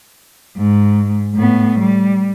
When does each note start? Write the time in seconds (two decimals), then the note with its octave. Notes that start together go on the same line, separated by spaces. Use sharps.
0.57 G#2
1.35 A2 B3
1.79 G3